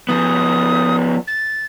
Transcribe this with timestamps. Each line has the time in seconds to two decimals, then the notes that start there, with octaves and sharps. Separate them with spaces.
0.09 F3 B3 D#6
1.27 A6